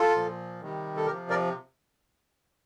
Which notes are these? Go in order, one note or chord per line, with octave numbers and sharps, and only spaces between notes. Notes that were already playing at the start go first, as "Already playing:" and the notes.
Already playing: F4 A4
A#2 F3
C3 D#3 G3
A4
C3 F3 G4 A#4
A#4 D5